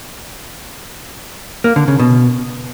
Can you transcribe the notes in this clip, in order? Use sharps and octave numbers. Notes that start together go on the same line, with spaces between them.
A#3
D3
C#3
B2